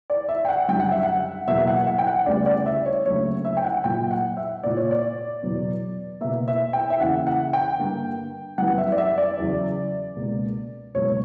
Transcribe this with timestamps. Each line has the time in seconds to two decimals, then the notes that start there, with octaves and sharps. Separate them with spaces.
0.10 D5
0.29 E5
0.45 G5
0.49 F#5
0.69 F#2 D3 G3 G5
0.80 F#5
0.92 E5
1.03 F#5
1.47 E2 B2 F#3 A#3 E5
1.58 E5
1.67 F#5
1.87 F#5
1.98 G5
2.07 F#5
2.26 D2 C#3 G3 B3 D5
2.46 D5
2.66 E5
2.86 C#5
3.05 D2 C#3 F#3 A#3 C#5
3.45 E5
3.57 G5
3.64 F#5
3.84 A#2 F#3 A#3 G5
4.11 F#5
4.37 E5
4.63 A#2 A#3 D5
4.77 C#5
4.91 D5
5.42 E2 B2 F#3 B3
6.21 B2 A#3 E5
6.48 E5
6.73 G5
6.90 E5
7.00 E2 C#3 E3 A#3 F#5
7.27 F#5
7.53 G5
7.79 G2 D3 A#3
8.58 F#2 E3 G3 B3 F#5
8.78 E5
8.92 D5
8.98 E5
9.18 D5
9.37 E2 C#3 F#3
10.16 C#2 B2 A#3
10.95 C#2 B2 F#3 A#3 C#5